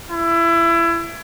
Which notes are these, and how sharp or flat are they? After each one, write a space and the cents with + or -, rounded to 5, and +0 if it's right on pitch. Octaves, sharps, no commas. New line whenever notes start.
E4 +25